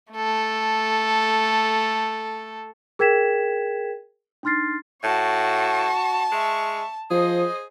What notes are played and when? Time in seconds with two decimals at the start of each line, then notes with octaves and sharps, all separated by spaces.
0.13 A3 A4
2.99 G#4 A#4 G5 G#6 B6 E7
4.43 D4 D#4 C6 F6 A6 C7
5.04 A2 F#4 A5 C#6
6.32 G#3 E5 C#6
7.11 F3 G#4 C5 D#5